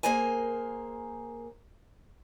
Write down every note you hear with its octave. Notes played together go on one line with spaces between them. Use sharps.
A#3 G#4 A#4 C5 G#5